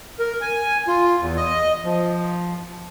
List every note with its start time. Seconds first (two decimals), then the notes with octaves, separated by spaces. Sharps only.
0.19 A#4
0.41 G#5
0.88 F4
1.20 E2
1.37 D#5
1.85 F3